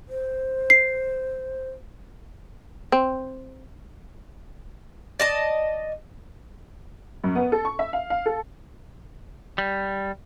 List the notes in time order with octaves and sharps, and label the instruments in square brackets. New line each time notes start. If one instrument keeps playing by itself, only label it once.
[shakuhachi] C5
[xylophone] C7
[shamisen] C4
[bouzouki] D5 D#5 A5
[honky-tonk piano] F#2
B3
A4
C#6
E5
F5
F5
A4
[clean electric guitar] G3